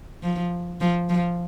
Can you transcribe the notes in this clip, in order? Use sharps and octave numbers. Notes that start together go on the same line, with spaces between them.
F3
F3
F3